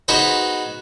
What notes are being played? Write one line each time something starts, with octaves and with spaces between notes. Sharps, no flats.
B3 D#4 F#4 G#4 B4 C5